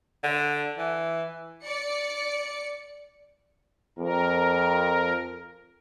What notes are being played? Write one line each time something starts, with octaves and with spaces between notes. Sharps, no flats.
D3
E3
D5 C#7
F2 A#4